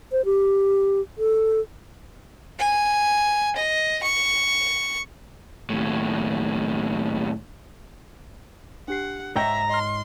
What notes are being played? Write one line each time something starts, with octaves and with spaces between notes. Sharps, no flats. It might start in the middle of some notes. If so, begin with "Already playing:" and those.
C5
G4
A4
G#5
D#5
C#6
D#2 A2
D4 G4 F#5 C7
G#2 C#5 E5 G5 A#5 E6 A#6
D#5 C6 F6